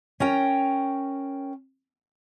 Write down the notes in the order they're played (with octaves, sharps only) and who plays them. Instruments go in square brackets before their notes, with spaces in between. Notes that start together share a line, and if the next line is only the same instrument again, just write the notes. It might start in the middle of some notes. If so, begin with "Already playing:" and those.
[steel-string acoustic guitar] C#4 A#4 G5